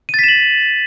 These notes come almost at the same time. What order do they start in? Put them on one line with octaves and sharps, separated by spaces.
D#7 A6 B6 E7 F#7